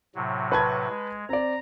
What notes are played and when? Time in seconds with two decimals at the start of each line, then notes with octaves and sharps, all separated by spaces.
0.15 A2 C3 F#3
0.52 B4 A5 G#6
0.89 G#3
1.29 C4 D5 A#5